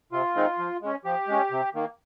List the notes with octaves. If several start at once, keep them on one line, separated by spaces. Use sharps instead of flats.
C3 F4
D#3 G#3 C4 D#4
F3
G#3 C#4
F3 G4
G#3 C#4
C3
D#3 A#3